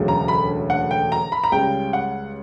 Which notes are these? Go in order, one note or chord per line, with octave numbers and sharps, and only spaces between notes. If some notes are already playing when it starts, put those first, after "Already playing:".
Already playing: E1 D2 C#3 F#3
A#5
B5
F#5
G5
A#5
B5
A#5
C#2 C#3 G3 G5
F#5